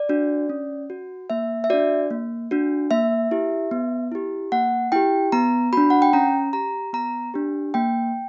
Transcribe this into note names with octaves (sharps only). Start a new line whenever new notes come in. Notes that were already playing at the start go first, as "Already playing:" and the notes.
Already playing: D5
D4 F#4
C#4
F#4
A#3 E5
E5
D4 F#4 D5
A#3
D4 F#4
A#3 E5
E4 G4
B3
E4 G4
A#3 F#5
E4 G4 G5
B3 A#5
D4 F#4 B5
F#5
G5
C#4 A#5
G4 A#5
B3 A#5
D4 G4
A#3 G5